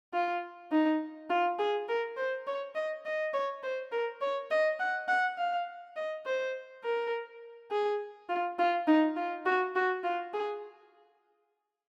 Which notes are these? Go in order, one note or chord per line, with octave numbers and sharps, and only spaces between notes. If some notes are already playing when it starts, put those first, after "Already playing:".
F4
D#4
F4
G#4
A#4
C5
C#5
D#5
D#5
C#5
C5
A#4
C#5
D#5
F#5
F#5
F5
D#5
C5
A#4
G#4
F4
F4
D#4
F4
F#4
F#4
F4
G#4